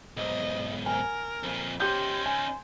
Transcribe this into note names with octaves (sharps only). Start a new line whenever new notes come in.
B1 G#2 D#5
A#4 G#5
F2 A#2
C#4 D#4 G4 C5 G6
G#5